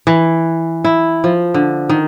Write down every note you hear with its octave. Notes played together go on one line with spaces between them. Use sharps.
E3
E4
F3
D3
D#3